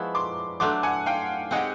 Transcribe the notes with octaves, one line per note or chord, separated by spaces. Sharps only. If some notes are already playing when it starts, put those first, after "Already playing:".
Already playing: F3 G#3 B3 E4 B5 C#6
C6 D6
F#3 A3 D4 C6 D6
F#5 G#5
F5 G5
G#3 C4 D#4 G4 F#5 G#5